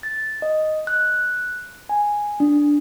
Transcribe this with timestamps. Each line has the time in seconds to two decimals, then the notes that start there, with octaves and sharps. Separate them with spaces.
0.03 A6
0.42 D#5
0.87 F#6
1.89 G#5
2.40 D4